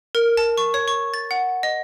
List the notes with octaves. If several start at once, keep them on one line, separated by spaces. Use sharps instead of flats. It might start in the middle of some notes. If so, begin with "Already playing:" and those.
A#4
A5
C#6
C#5
C#6
A6
F#5
D#5